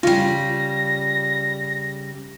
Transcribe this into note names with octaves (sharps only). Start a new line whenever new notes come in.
C#3 G3 F4 A#6